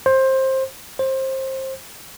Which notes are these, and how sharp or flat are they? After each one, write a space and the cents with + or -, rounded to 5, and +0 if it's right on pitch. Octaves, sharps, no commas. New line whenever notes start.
C5 +20
C5 +25